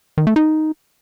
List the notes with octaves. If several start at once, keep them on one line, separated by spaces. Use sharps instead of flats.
D#3
A3
D#4